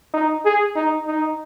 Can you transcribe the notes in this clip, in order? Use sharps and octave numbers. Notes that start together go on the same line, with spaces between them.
D#4
G#4
D#4
D#4